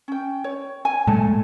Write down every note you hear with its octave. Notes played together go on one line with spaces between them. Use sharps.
C#4 G5
C#5
G#5
A#2 G#3 A3 A5